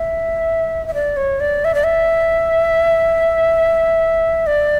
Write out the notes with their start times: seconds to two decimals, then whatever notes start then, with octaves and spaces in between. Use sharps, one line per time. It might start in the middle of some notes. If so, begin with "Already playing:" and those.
Already playing: E5
0.88 E5
0.94 D5
1.17 C#5
1.40 D5
1.65 E5
1.75 D5
1.84 E5
4.47 D5